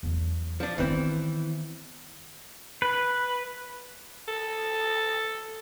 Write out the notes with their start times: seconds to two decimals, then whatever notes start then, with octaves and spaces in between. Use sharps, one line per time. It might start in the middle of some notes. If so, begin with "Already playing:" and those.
0.03 E2 F#3
0.60 F3 D4
0.78 D#3 E3 B3 C4
2.82 B4
4.28 A4